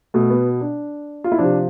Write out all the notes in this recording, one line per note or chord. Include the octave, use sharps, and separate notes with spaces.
B2 A3
B3
D4
F4
E4
C3 F3 D4